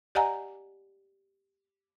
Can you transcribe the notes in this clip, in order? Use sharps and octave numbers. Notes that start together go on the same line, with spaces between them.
G4 D5 D#5 F#5 G#5 A#5